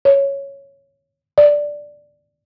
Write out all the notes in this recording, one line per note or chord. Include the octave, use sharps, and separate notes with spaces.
C#5
D5